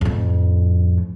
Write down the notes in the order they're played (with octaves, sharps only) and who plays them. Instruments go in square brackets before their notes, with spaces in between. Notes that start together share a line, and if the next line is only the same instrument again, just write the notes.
[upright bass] F2 A2